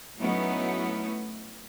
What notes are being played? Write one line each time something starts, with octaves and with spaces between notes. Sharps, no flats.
F#3 A3 B3 C#4 D#4 E4